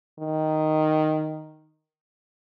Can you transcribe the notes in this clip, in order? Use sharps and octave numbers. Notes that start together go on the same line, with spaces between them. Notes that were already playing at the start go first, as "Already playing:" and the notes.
D#3